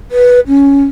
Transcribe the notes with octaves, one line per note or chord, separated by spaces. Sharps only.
B4
C#4